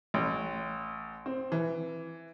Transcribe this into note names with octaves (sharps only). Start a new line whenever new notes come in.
A1
C4
E3